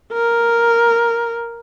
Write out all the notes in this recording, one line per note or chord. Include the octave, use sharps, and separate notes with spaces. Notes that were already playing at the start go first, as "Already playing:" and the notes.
A#4